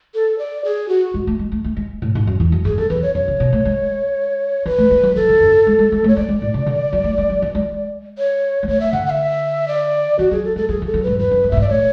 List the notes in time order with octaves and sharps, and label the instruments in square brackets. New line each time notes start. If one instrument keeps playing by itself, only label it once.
[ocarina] A4
D5
G#4
F#4
[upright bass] G#3
A3
G#3
A3
A3
G#3
A2
G#2
F#2
E2
F#2
[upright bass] F#2 [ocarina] G#4
[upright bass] F#2 [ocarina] A4
[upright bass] E2 [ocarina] B4
[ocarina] C#5
[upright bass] F#2 [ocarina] C#5
[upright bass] C#3
B2
A3
G#3
[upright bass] E3 [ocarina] B4
[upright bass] A3
G#3
F#3
[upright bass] E3 [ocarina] A4
[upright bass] D3
F#2
G#3
G#3
G#3
[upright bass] A3 [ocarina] C#5
[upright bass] G#3 [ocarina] D5
[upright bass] G#3
A2
C#3
D3
F#3
A3
G#3
F#3
E3
G#3
[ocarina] C#5
[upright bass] G#3
[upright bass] A3 [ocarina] C#5
[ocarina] E5
[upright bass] D3 [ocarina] F#5
[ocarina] F#5
E5
D5
[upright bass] E3 [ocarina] F#4
[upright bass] F#3 [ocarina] G#4
[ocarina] A4
[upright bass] G#3 [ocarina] A4
[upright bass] F#3 [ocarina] G#4
[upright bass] E3 [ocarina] A4
[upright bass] F#3
[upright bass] G#2 [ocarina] B4
[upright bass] E2 [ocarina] B4
[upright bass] F#2
G#2
[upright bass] A2 [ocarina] E5
[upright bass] G#2 [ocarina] D5
[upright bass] A2 [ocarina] C#5